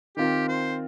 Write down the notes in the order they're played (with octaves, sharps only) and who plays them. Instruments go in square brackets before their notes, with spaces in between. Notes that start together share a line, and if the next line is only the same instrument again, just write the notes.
[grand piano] D#3 C4 F4 A#4 [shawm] G4
[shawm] C5